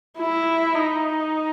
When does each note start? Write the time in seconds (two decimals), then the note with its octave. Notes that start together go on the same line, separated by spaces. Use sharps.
0.19 E4
0.75 D#4